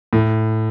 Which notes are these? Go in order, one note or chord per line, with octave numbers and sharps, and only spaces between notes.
A2